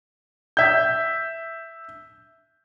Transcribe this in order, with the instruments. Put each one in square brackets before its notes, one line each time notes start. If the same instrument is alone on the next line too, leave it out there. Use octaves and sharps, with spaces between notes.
[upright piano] E5 G6